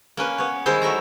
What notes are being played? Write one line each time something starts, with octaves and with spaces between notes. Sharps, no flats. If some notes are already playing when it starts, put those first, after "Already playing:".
A#3 C#4 B4
B3 C#5
D#3 G3 G#3 E4 C5
F#3 A3 E5 A#5